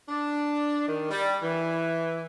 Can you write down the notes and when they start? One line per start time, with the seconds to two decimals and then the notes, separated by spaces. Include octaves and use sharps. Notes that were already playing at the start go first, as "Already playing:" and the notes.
0.08 D4
0.88 D#3
1.11 G3
1.42 E3